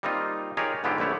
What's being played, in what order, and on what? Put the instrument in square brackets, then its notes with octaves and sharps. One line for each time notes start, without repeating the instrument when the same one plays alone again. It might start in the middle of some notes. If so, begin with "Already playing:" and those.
[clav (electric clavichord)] G3 A#3 C4 D#4 F4
D#4 F4 G4 G#4 A#4 C#5
G#2 D3 B3 E4 F4 G4
A#1 D3 A3 E4 C#5